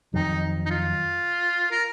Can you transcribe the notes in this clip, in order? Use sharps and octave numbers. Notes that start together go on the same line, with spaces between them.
F2 D#3 F#3 D#4
D#4
F4
A#4